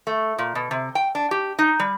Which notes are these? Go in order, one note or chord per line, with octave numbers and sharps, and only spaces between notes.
A3
A#2
B2
C3
G5
D4
G4
D#4
G3